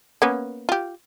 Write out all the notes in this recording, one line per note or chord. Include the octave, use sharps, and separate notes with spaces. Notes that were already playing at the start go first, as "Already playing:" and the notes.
A#3 B3 C#4
F4 G4